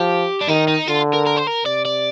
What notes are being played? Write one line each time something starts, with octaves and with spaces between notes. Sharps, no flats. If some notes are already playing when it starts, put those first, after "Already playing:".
Already playing: F3 G4
D4
D#3 D#4
D#4
D3 F4
A#4
A#4
C5
A#4
C3 D5
D5